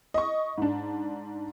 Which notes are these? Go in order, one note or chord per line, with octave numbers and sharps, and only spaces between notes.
D#5 C#6
G#2 D4